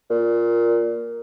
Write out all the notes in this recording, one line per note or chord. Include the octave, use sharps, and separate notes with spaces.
A#2